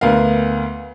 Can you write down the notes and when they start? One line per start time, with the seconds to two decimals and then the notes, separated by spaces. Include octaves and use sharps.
0.01 D2 B3 A#4 F5